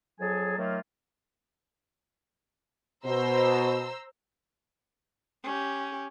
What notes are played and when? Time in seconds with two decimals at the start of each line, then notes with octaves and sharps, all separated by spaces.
0.20 F2 F#3 G#4 G#5 A5
0.58 D#3 F#3 A3 A#3 F4
3.05 B2 C5 A#5 E6
5.43 C#4 G4